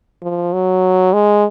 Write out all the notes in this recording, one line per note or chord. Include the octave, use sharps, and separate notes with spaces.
F3
F#3
G#3